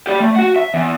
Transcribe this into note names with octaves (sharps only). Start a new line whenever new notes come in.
G4 D5
A3
F#4 F#5
E5
E2